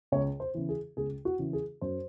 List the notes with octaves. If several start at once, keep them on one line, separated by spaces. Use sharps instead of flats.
C#2 C#5
C5
C#3 E3
G#4
C#2 G#4
F#4
C#3 E3
G#4
F#2 C5